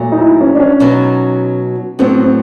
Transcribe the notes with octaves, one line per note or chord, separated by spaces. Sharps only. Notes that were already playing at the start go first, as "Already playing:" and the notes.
Already playing: A#2 F#3 A3
D#4
E4
C#4
D4
C#4
B2 F#3 B3 D#4
A2 F#3 B3 C4